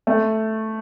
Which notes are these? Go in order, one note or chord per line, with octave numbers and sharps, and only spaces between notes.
A3